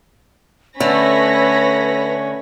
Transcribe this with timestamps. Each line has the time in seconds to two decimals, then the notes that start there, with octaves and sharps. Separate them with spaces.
0.80 D3 A3 C#4 B4 C#5 B5 A#6